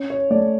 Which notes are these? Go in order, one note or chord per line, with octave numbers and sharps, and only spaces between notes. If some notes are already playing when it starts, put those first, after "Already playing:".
Already playing: C#4
C#5
A3 D5